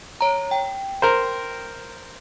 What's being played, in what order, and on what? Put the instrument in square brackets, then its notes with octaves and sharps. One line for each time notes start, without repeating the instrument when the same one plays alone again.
[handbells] C#5 A#5
G5
[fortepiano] A#4 C5